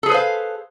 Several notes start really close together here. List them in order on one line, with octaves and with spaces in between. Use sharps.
A4 G#4 B4 C5 F5